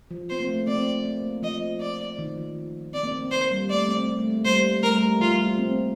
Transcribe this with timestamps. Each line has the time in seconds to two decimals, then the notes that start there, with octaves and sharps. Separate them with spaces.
0.11 F3
0.29 C4 C5
0.40 A#3
0.49 A3
0.67 C4 D5
1.05 A#3
1.43 F3 D#5
1.80 D5
2.18 D#3
2.37 F3
2.94 C4 D5
3.03 A#3
3.12 C4
3.31 A#3 C5
3.51 G3
3.69 A3 D5
3.88 C4
4.07 A#3
4.19 A3
4.30 A#3
4.45 G3 C5
4.83 A3 A#4
4.91 G3
5.00 A3
5.20 F3 F4
5.33 G3
5.46 A#3
5.58 C4